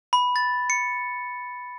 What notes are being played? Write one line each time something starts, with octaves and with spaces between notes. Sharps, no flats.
B5
A6
C#7